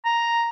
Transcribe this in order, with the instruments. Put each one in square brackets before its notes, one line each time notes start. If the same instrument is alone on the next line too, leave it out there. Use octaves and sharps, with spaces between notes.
[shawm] A#5